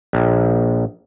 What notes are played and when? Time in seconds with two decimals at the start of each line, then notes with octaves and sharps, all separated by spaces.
0.13 A#1